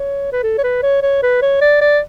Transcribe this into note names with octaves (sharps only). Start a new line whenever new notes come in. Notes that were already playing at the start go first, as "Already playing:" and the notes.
Already playing: C#5
B4
A4
C#5
B4
C#5
C#5
B4
C#5
D5
D5